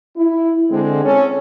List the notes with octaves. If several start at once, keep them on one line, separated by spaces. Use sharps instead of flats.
E4
D3 G#3 C4
C#4 A4